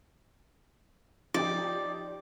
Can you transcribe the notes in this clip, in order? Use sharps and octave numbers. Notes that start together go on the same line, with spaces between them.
F3 D#4 G4 D5